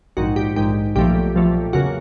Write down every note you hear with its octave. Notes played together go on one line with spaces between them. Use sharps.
A#1 G#2 D#3 F#4
G4
A#1 G#2 D#3 G4
B1 A#2 F3 A3 G4
B1 A#2 F3 A3
E2 C#3 F#3 A#3 F#4